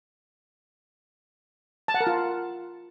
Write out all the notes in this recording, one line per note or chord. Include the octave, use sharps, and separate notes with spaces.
A5
F#5
A#4
F4